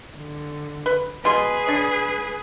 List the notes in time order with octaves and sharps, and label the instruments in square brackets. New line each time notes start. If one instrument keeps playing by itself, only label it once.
[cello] D3
[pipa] B4
[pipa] B2 C6 [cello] G#4 B4
[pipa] D4 C#5